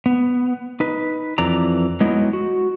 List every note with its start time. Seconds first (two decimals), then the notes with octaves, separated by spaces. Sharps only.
0.06 B3
0.80 D#4 B4
1.38 F2 E3 D5 A#5
2.00 F#3 G#3 B3 D#4 E4
2.33 F#4